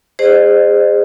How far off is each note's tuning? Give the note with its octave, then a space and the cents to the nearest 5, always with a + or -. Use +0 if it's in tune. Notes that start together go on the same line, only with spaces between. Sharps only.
G#4 -25 C5 +0 D#5 -40